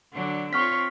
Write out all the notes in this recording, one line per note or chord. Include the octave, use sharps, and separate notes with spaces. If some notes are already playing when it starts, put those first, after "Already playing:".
D3 F#3 D4
C4 F4 C#5 C#6 F6 B6